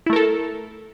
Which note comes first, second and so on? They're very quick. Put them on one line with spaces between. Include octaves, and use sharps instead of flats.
E4 A3 A#4 A4